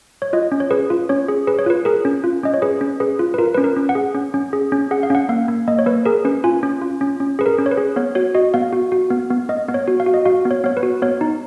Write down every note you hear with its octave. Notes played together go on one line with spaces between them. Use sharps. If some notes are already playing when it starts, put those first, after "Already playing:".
C#5
F4 D#5
C#4
C#5
G#4 B4
F4
C#4 C#5
G#4
G#4 B4
C#5
F4 B4
G#4 A#4
C#4
F4
C#4 D#5
C#5
G#4 B4
C#4
G#4 B4
F4
B4
F4 A#4
C#4 B4
A#4
C#4
F#5
G#4
C#4
C#4
G#4
C#4
G#4 F#5
F5
C#4 F#5
A#3 F5
A#3
A#3 D#5
C#5
A#3 B4
G#4 A#4
C#4 B4
F4 G#5
C#4
F4
C#4
C#4
G#4 B4
A#4
C#4
C#5
B4
G#4
B3 C#5
F#4 C#5
F#4 D#5
B3 F5
F#4
F#4
B3
B3
B3 D#5
B3
C#5
F#4
F5
F#4
D#5
F#4 F5
B3
C#5
B3 C#5
B4
F#4
B3 C#5
D#4